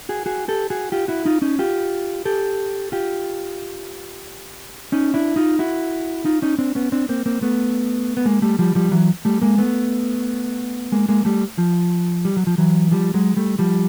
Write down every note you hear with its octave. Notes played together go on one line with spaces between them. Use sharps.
F#4 G#4
F#4 G#4
G4 A4
F#4 G#4
F4 G4
E4 F#4
D#4 F4
C#4 D#4
F4 G4
G4 A4
F4 G4
C#4 D#4
D4 E4
D#4 F4
E4 F#4
D#4 F4
C#4 D#4
C4 D4
B3 C#4
C4 D4
A#3 C4
A#3 C4
A3 B3
B3
G#3 A#3
G3 A3
F3 G3
F3 G3
E3 F#3
G3 A3
G#3 A#3
A3 B3
G#3 A#3
G#3 A#3
G3 A3
F3
G3
F#3
F3
E3 F#3
F3 G3
F#3 G#3
G3 A3
F3 G3